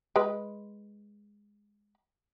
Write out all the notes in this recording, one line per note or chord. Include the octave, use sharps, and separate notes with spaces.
G#3 B4